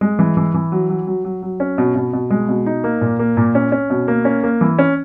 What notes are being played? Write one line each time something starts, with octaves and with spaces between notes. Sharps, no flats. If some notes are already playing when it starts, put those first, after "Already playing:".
G#3
E3
E3
E3
F#3
F#3
F#3
F#3
F#3
C#4
B2
B2
B2
G#3
B2
D#4
A#3
A#2
A#3
A#2
C#4
C#4
B2
A#3
C#4
A#3
E3
C#4